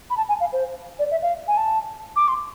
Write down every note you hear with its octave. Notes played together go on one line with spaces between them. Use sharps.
B5
A5
G#5
F5
C5
D5
E5
F5
G#5
A5
D6
C6